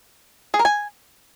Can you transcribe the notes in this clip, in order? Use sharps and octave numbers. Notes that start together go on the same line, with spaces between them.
G#4
A#4
G#5